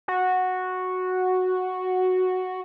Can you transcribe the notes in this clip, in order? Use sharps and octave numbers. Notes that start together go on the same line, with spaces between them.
F#4